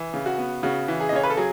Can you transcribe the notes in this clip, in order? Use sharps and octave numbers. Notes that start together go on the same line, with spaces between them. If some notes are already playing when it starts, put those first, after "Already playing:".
Already playing: E3
C#3
F#4
B3
C#3 F#4
E3
G#4
D#5
C#3 C#5
B4
A4
F#3 G#4